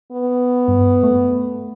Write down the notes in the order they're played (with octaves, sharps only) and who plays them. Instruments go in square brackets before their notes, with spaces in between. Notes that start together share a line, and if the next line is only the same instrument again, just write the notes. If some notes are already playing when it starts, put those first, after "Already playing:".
[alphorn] B3
[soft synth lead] G2
A3